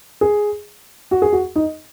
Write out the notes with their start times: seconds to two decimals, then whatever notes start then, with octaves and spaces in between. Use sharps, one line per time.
0.21 G#4
1.11 F#4
1.22 G#4
1.33 F#4
1.56 D#4